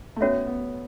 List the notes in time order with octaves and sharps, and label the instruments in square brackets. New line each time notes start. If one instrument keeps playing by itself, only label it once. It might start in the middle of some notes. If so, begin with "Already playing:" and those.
[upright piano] A3
[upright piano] B3 [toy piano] C#4 F#4 C#5 E5
[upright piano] B3